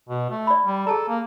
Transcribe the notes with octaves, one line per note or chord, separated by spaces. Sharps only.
B2
A3
D5 B5
G3
G#4 A4 A5 A#5
A#3